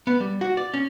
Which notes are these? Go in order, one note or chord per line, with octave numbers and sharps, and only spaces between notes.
B3
G3
F#4
D5
C#4